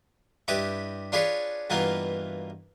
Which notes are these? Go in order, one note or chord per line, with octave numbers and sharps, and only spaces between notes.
G2 E4 G4 B4 D#5 D6
D4 F4 G#4 B4 C#5 D5
G2 B2 E3 A#3 B3 F4